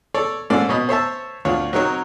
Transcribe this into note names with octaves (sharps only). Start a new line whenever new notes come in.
A4 C#5 D5
G#2 A#3 C#4 A4 D5
B2 C#5 D#5 B5
C5 C#5 E5 A5
D2 D4 F4 C#5
F#3 C4 D#4 A#4 C#5